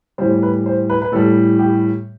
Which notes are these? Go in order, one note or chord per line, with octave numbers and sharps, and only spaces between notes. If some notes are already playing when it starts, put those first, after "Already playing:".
A2 E3 G3 C5
B4
C5
B4
B4
A2 E3 G3 A4
G4